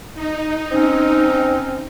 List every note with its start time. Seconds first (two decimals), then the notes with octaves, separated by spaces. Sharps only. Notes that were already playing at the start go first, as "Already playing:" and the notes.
0.15 D#4
0.72 C4 C#4